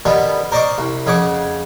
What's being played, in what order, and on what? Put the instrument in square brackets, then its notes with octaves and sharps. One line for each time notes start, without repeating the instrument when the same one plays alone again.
[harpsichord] D3 D#3 G3 B3
A#4 C5 D5 D#5 C#6 D6
C2
F2 C#3 G#4 F#5 D6